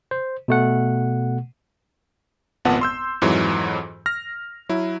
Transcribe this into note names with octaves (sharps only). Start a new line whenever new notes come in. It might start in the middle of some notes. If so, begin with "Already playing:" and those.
C5
B2 A3 F#5
G#1 F2 A#2 B3 F#5 A5
C6 E6 G6
F2 G#2 E3 F#3
F6 A#6
F#3 E4